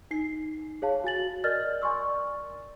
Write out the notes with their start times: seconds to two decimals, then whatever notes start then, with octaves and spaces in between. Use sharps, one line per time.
0.11 D#4 C7
0.82 G#4 C#5 F5 A5
1.04 F#4 G#5 A6 F#7
1.44 A#4 D5 D#5 F6 A6
1.82 D5 G#5 C6 C#6 E6